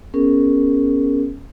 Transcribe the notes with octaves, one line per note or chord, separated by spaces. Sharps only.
B3 C#4 G#4 A#4